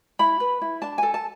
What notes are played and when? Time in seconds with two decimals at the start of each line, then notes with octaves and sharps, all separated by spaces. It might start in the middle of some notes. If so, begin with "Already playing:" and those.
0.19 E4 B5
0.40 B4
0.61 E4
0.82 D4 A5
0.98 A4 G#5
1.14 A5